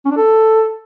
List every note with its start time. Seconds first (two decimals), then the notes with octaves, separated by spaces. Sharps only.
0.05 C#4
0.11 D4
0.17 A4